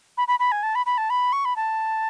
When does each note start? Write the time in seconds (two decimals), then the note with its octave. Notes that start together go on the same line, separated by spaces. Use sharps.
0.17 B5
0.28 B5
0.39 B5
0.52 G#5
0.63 A5
0.75 B5
0.86 B5
0.98 A5
1.10 B5
1.33 C#6
1.45 B5
1.56 A5